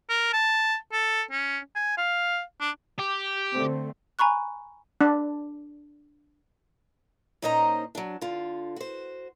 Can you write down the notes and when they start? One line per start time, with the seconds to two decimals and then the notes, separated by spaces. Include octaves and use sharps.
0.10 A#4
0.33 A5
0.92 A4
1.31 C#4
1.76 G#5
1.98 F5
2.61 D4
2.99 G4
3.52 D3 A3 C4
4.19 G#5 A#5 B5 C#6 F#6
5.01 D4
7.42 A#2 C#4 D#4 C5 D#5 A#5
7.95 F#3 D4
8.21 D3 F4
8.76 F#4 C5